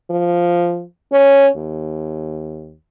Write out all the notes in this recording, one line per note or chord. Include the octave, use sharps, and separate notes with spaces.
F3
C#4
D#2